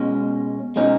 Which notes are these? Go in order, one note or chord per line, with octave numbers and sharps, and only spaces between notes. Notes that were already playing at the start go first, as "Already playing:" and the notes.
Already playing: B2 G#3 C#4
B2 G#3 C#4 D#4